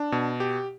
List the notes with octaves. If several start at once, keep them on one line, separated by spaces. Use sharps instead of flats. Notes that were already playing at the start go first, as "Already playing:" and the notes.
Already playing: D4
B2
G4